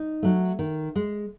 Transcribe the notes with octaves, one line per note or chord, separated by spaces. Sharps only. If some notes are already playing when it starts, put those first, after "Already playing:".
Already playing: D#4
F#3 A3
D#3
G#3